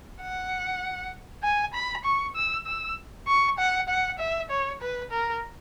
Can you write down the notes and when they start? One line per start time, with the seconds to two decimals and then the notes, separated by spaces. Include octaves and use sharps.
0.21 F#5
1.43 G#5
1.74 B5
2.04 C#6
2.36 E6
2.66 E6
3.27 C#6
3.59 F#5
3.89 F#5
4.19 E5
4.50 C#5
4.81 B4
5.11 A#4